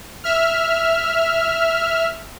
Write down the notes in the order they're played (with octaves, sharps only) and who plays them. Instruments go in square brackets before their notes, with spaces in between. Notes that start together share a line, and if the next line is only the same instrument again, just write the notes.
[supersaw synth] E5 F6